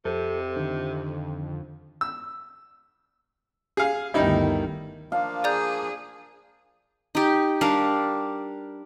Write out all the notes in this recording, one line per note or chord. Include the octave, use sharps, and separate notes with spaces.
F2 C3 A4
D3 D#3
E6
G#4 F5
G1 D2 D#3 G3 D#4 E4
F3 A#3 D4 F5
G#4 D5 A#5 G6
D#4 G4
G3 D4 A#4 F5